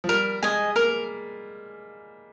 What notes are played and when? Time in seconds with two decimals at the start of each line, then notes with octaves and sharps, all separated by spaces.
0.04 F3
0.09 G3 A#4
0.43 G#3 D#5 G#5
0.76 A#3 A#4